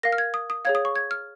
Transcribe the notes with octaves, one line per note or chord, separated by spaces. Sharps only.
A#4 F5 A#6
F6
G#6
D#6
D#6
G#4 C#5 F5 G#6
D#6
C#6
G#6
F6